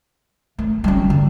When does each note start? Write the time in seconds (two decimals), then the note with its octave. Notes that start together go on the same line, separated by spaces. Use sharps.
0.58 A3
0.84 G3 C#4
1.10 D3